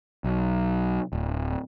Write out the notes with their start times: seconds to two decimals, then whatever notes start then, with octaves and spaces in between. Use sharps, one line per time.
0.24 B1
1.13 D1